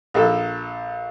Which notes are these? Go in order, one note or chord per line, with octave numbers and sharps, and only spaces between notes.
A#1 A4